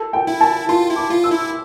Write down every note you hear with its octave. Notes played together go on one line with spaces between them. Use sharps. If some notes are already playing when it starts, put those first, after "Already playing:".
Already playing: A4
G5
E4
A5
F4 C6
E4
D6
F4
E6
E4